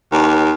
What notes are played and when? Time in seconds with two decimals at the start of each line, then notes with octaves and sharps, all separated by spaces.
0.12 D#2